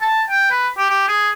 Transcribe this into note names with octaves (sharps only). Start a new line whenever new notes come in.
A5
G5
B4
G4
G4
G#4